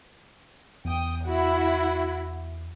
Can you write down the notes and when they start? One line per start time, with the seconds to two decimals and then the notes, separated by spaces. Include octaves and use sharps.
0.85 E2 G5 D#6
1.24 E4 F#4